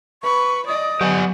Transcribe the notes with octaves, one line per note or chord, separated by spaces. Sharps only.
B4 C#6
D5 D#5 D#6
F#3 B3 G4 D5 G#5